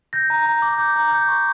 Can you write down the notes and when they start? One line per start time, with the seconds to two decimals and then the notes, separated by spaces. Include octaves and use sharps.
0.13 G6 A#6
0.30 A#5
0.46 A#5
0.62 D6
0.78 G6
0.96 A#5
1.11 G6
1.28 C#6